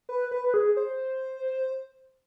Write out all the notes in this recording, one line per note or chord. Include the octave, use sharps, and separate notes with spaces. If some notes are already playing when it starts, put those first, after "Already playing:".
B4
B4
B4
G#4
C5